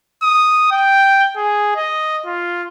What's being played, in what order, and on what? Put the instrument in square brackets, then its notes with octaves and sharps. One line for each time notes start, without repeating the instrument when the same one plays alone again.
[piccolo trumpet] D#6
G5
G#4
D#5
F4